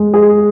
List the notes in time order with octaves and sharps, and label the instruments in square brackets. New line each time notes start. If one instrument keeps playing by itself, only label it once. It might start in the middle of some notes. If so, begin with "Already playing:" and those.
Already playing: [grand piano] G#3
G#4